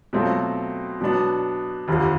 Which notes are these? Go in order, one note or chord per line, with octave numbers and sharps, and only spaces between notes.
B2 F#3 A3 C4 F4
B2 F#3 B3 D4
F1 D#2 D3 F3